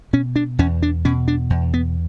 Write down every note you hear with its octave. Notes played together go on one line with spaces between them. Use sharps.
B2 C#4
D4
E2 C#4
D4
B2 C#4
D4
E2
B3